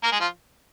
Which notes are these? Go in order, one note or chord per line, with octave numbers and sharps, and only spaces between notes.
A#3 A#4
G#3 G#4
F3 F4